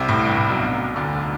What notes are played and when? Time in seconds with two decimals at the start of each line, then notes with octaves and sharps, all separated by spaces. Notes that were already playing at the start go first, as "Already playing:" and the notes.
Already playing: C2 C3
0.09 A2
0.25 G2
0.38 A2
0.49 B1 B2
0.96 D2 D3